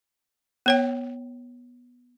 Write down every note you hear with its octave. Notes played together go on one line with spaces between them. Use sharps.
B3 C#5 G5